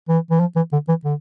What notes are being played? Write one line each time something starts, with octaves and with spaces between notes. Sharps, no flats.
E3
E3
F3
E3
D3
E3
D3